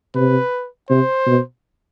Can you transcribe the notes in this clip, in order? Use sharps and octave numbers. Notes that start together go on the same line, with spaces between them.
C3 B4
C3 C5
B2